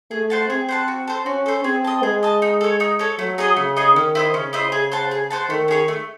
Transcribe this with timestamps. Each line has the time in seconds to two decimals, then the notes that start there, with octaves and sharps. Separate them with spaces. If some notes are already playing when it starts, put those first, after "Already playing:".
0.11 A3 G#4
0.30 C5 F#5 A5
0.49 C4 G#4
0.69 C5 F#5 A5
0.88 F#4
1.08 A4 C5
1.26 C#4 F#4
1.46 A4 C5
1.64 C4 G#4
1.84 D#5 A5
2.03 G#3 G#4
2.23 D#5 A5
2.42 D#4
2.61 A4 C#5
2.80 D#4
2.99 A4 C#5
3.18 F#3 A3
3.38 D#4 G#4 D#5
3.57 C#3 A3
3.76 D#4 G#4 D#5
3.95 D#3 C#4
4.15 E4 C5 D#5
4.34 C#3 C#4
4.53 E4 C5 D#5
4.72 G#4
4.92 C5 F#5 A5
5.11 G#4
5.30 C5 F#5 A5
5.49 D#3 A3
5.68 C#4 G#4 C#5
5.88 A3